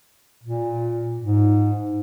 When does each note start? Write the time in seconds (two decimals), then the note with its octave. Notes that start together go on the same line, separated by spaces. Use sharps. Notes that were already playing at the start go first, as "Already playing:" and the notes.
0.43 A#2
1.19 G#2